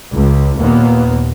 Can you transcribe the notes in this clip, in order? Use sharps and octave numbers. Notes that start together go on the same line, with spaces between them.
C#2
D#2 A#2 A#3 B3